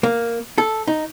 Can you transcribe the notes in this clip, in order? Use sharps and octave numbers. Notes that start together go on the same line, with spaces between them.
A#3
A4
D#4